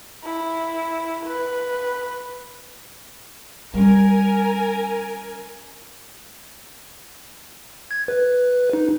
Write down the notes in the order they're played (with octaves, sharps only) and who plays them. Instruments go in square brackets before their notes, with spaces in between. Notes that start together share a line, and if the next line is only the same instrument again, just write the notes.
[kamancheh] E4
B4
[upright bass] G3 C#4 [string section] A#4 G#5
[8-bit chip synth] G#6
B4
D#4